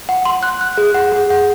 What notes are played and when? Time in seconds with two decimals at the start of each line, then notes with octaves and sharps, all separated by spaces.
0.09 F#5
0.25 C6
0.43 F#6
0.61 F#6
0.77 G#4
0.94 F#5
1.12 G#4
1.30 F#5